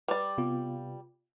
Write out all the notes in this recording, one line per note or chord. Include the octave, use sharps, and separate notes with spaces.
G3 B4 D5
C3 B3 F4